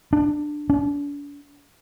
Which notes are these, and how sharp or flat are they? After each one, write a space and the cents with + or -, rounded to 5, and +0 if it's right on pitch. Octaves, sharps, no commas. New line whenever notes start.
D4 +15
D4 -40